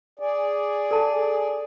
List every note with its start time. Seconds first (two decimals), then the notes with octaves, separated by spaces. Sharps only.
0.19 G#4 D5
0.91 A4 A5